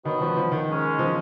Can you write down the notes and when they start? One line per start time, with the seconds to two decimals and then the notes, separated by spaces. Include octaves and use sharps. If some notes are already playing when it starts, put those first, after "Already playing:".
0.05 B2 D#3 F#3 B3 F#4 B4
0.21 F3
0.37 F3
0.52 D#3
0.68 D#3 G#3 C#4
0.99 F3